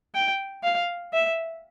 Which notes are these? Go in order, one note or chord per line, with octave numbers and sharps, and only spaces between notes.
G5
F5
E5